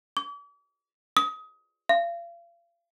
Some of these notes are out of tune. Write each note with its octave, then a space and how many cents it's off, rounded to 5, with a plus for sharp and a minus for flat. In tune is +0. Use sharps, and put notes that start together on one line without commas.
D6 -45
D#6 +25
F5 -35